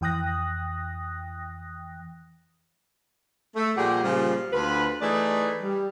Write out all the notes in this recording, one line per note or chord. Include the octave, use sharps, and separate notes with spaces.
F2 E3 G5 D#6 F#6 A#6
A3
A#2 F3 G3 G4 G#4 F#5
A#2 C#3 F3 G3
D2 D3 F4 B4
E3 A3 D#4 G#4 B4 D5
G3